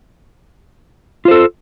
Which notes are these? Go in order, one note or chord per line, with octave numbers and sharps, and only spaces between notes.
F4 A4 C5